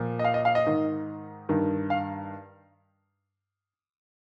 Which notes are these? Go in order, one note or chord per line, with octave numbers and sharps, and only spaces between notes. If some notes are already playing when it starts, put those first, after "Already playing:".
Already playing: A#2 F3
D#5
F5
D#5
F5
D#5
G#2 D#3
G2 D#3
F5